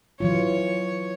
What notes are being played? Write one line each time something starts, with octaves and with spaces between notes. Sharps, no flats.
E3 F#3 F4 C#5